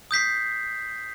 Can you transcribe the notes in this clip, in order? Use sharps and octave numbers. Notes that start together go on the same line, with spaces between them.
D#6 G6 B6 C7